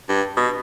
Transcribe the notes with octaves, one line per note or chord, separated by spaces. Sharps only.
G2
B2